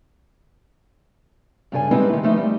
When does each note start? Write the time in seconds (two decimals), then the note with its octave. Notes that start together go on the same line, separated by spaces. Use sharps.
1.72 G2 C#3 D4 A4 B4 G#5
1.91 G3 G#3 C4 D#4 E4 B4
2.09 D#3 A3
2.23 F3 A3 D#4 B4 E5
2.37 G3